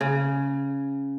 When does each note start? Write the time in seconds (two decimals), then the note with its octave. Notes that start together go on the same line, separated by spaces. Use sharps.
0.01 C#3